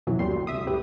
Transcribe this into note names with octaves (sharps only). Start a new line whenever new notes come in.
F#2 B2 E3 F#3
G1 D2 G3 C#4 C6
D3
C2 E5 D#6
C#2 A2 G4 B4